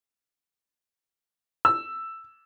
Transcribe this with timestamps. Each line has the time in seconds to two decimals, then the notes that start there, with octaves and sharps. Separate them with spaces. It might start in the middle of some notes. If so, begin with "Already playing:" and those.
1.65 E6